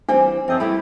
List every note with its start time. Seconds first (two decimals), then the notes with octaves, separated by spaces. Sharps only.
0.09 E3 G3 C4 D4
0.48 F#2 C3 F3 C4 D#5
0.60 G3 A3 E4 G4